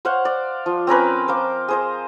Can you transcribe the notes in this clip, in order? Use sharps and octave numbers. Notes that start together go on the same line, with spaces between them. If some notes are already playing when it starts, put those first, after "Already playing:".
C5 C#5 F5 F#5
D5
F3
C4 C#4 A#4 B4
C5 F5 D6
G#4 C5 D#5